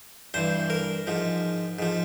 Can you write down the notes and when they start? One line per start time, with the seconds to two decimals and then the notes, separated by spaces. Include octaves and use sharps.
0.34 G2 E3 C5
0.70 A#4
1.07 G#2 F3
1.79 G#2 F3